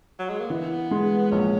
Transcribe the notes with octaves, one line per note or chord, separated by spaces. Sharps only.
F#3
G#3
A#3
E3 B3
G#3
A#1 C#4